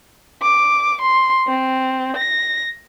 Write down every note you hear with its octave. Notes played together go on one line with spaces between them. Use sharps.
D6
C6
C4
A#6